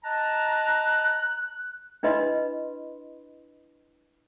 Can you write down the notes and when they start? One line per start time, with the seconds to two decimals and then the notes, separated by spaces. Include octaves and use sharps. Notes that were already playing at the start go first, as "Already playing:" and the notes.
0.04 D#5 A5 A#5 F#6
2.03 D4 E4 B4 D#5 B5 C6